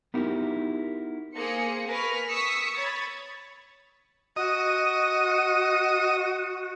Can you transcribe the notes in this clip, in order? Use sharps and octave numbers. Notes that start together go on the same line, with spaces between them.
B3 D#4 E4 F#4 G4 A#4
A#3 G#4 C5 C#7
A#4 B4 G#5 B5 C#6 F6
C#6 D#6 E6 B6 C#7
C#5 B5 G#6 A6
F#4 D#5